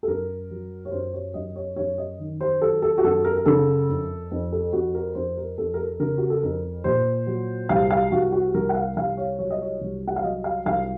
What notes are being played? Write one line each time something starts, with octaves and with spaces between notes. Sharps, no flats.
A4
F#2 A#4
F#3
C#5
F#2 C5
C#5
F#2 D#5
C#5
F#2 C#5
D#5
D#3
C5
F#3 A4
A4
F#4
F#2 A4
A#4
A#4
C#3 A4
F2
F2
A4
F2 F#4
A#4
F2 C5
A#4
F2 A4
A#4
A4
C#3 A#4
F#4
A4
F2 A#4
A#2 C5
F#3
C2 F5
F5
C2 F#4
F#4
C2 A#4
F#5
F5
C2 F5
C#5
F#3 C#5
D#5
C#5
C2
F#5
F5
F#3 D#5
F5
C2 F5